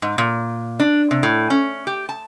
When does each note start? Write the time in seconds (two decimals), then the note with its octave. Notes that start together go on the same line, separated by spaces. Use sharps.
0.02 G#2
0.18 A#2
0.80 D4
1.11 C3
1.23 A2
1.50 C#4
1.87 G4
2.09 A5